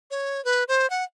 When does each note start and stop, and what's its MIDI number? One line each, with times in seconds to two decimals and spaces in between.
0.11 0.43 73
0.45 0.64 71
0.68 0.89 72
0.90 1.04 78